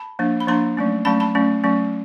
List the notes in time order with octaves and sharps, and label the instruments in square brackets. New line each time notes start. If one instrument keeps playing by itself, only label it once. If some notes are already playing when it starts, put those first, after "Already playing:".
Already playing: [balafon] A5 B5
F3 A#3 D4
B5
F3 A#3 D4 A#5 C6
F#3 A3 C#4
F#3 A3 C#4 A5 B5
A5 B5
F#3 A3 C#4
F#3 A3 C#4